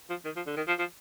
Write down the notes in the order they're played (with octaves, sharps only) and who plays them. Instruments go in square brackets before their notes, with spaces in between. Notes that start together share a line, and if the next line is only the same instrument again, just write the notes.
[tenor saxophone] F3
D#3
F3
D3
D#3
F3
F3